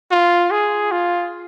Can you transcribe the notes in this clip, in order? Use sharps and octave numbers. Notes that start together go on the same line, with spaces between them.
F4
G#4
F4